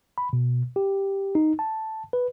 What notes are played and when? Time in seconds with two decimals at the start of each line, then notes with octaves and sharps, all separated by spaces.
0.18 B5
0.33 B2
0.76 G4
1.35 D#4
1.59 A5
2.13 B4